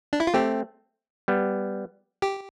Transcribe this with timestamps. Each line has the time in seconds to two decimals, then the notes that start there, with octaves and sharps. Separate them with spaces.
0.13 D4
0.20 E4
0.27 F4
0.34 A3 C4 G4
1.28 G3 B3
2.22 G4